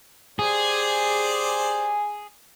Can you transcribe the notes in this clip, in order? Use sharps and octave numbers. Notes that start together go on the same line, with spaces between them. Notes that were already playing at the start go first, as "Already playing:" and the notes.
G4 G#4 C5 D5